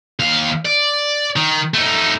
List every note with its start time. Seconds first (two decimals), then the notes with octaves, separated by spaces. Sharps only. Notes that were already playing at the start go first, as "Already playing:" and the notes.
0.19 D#2 F5
0.65 D5
1.36 D#3
1.74 A3 D#4